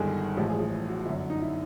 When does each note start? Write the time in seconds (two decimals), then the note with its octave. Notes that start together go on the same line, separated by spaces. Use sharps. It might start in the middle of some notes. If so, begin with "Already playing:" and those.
Already playing: G1 G2 D#3 G#3 G#4 A4
0.37 A1 A2 F3 G#3 G4
0.49 G#4
0.60 G#4
0.88 F#4
1.06 G1 F#2 D3 E4
1.30 D#4
1.41 E4